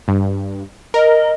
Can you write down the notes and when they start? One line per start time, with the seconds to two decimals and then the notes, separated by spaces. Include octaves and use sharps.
0.08 G2
0.94 A#4 D#5